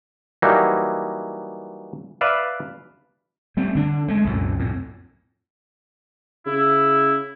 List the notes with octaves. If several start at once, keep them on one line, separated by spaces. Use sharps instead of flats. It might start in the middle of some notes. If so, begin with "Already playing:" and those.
E3 F#3 G3 A#3 D#4
B4 D5 E5 F5
G3 A3 C4
D3 D4
G#3 A3
C2 F#2 A#2
F2 A2
C#3 E4